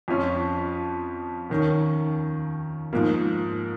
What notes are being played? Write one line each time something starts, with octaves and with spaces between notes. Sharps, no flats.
F2 F3 C#4 F4
D#2 D#3 C#4
G#2 F3 A#3